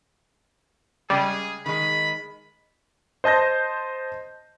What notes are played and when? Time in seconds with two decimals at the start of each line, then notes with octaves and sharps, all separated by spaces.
1.10 C#3 G3 G#3 G#4
1.66 D#3 G#3 B5
3.24 C5 D#5 A5 G6 A#6